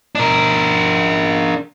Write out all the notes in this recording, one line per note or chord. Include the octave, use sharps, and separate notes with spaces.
D4 A#4